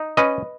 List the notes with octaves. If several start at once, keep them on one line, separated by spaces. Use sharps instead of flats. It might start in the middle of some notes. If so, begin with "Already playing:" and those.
Already playing: D#4
C#4 B4 D#5